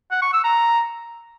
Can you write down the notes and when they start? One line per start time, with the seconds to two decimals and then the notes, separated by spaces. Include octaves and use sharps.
0.11 F#5
0.22 C#6
0.33 E6
0.44 A#5